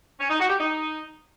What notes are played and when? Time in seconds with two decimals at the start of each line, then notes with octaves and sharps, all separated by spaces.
0.20 C#4
0.30 D#4
0.40 F#4
0.50 G4
0.59 D#4